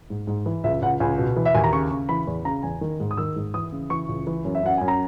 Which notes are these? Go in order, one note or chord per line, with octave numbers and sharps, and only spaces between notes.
G#2
G#2
E3
C#2 E5
C#2 F#5
C#2 G#5
B2
E3
E5
D#2 G#5
A#5
C#3 C#6
C#3
E3 B5
E2
C#3 A#5
E2 G#5
D#3
G#2
D#6
D#3 E6
G#2
E3 D#6
C#3
E3 C#6
C#2
E3
F#2
E5
F#2 F#5
F#2 G#5
A#5